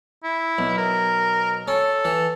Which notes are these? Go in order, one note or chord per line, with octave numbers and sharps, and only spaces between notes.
E4
B1
A#4
C#4 A4
E3